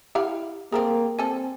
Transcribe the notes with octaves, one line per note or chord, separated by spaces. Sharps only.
E4 G4 F5 F#5
G3 A3 A#3 C4 G#4 A#5
G3 C4 A4 G#5